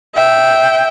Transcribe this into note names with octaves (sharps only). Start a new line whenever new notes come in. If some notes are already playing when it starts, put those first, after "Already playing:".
E5 G5